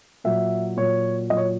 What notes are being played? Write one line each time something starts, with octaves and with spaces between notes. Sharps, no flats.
A#2 F#3 E5
A#2 F#3 C#5
A#2 F#3 D#5
C#5